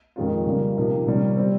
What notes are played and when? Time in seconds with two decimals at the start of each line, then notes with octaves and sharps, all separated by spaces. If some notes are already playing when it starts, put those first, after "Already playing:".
0.16 F2 D#3 G#3 C#4 F4
0.46 C#3 G3 A#3 F4
0.77 C3 F3 A#3 D#4
1.06 C3 D#3 G3 C#4
1.36 G3 C4